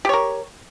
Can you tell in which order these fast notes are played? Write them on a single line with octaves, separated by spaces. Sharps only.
G4 C#5 A#4